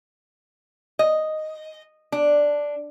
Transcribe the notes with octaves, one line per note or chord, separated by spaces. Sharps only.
D#5
D4